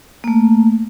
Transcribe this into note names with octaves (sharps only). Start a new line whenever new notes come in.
A3 A#3